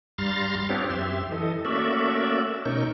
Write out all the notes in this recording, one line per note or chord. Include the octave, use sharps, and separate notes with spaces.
G2 G3 F5 A#5 C6 A6
B3 C4 D4 F4 G4 C#5
F#2 G4 E5 C6
E3 A4 D#5
A3 A#3 C#4 F#4 D5 E5
B2 C#4 D#4 A#4 C#6 G6